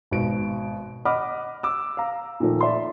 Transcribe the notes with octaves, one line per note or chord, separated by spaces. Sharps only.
G#1 B2 D7
D#5 F#5 B5 D6 F6
D6 E6
F5 A#5
A#2 D#3 F3 A3
D5 E5 C6